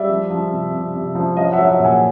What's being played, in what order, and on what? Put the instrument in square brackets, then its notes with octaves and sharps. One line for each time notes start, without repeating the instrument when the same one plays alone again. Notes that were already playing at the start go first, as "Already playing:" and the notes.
Already playing: [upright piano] G3 D5 E5
F3
F3
C3
C3
C3
F3
F#3 D#5 F5
E5 F#5
F#3
E5 F#5
A#2
F#5 G#5